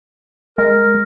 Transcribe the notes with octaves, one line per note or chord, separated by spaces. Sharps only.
G#3 A#4